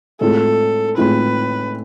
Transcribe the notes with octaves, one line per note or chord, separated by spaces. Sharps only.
A2 G#3 C4 F4 A4
A2 G#3 C4 F4 B4